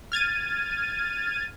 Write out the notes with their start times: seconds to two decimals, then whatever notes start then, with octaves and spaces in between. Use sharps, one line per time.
0.12 F6 G#6 A6 D#7